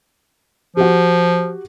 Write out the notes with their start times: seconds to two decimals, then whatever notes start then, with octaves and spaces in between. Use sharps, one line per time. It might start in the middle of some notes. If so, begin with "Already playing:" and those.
0.77 F3 F#4 G4